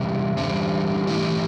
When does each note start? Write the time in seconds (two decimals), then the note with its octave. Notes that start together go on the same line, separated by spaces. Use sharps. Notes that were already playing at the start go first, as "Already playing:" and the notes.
Already playing: E2 C3 G3
0.37 E2 D3 G3 C4
1.07 E3 A3 E4 G4